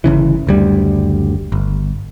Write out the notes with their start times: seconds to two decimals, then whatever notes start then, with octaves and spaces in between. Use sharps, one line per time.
0.04 G1 C#3 E3
0.47 F#1 D2 G3
1.52 G1